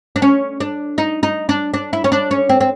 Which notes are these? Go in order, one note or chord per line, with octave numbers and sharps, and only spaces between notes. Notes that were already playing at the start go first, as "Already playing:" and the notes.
D4
C#4
D4
D#4
D#4
D4
D4
E4
C#4
D4
C#4
C4
C4